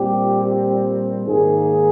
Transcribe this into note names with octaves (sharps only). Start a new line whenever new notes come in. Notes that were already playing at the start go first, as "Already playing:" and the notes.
Already playing: A#2 G3 C4 G4
G4
G#2 D#3 A#3 G#4